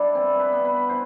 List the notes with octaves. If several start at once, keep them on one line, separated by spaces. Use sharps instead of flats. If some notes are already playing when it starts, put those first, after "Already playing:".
Already playing: G3 D4 E4
E3 C4
B4
B3
B4
E3 C5